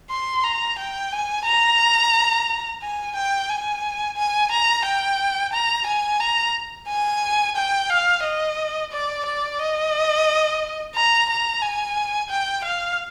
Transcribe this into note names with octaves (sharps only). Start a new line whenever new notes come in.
C6
A#5
G5
G#5
A#5
G#5
G5
G#5
G#5
A#5
G5
A#5
G#5
A#5
G#5
G5
F5
D#5
D5
D5
D#5
A#5
A#5
G#5
G5
F5